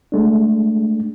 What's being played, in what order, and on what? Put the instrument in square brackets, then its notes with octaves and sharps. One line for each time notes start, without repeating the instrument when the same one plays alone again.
[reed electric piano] G#3 A3 D4